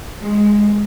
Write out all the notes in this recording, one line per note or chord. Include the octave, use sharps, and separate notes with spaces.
G#3